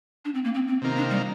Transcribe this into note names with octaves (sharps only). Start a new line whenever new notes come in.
D4
C4
A#3
C4
C4
C3 D#3 A#3 F4
D4
G3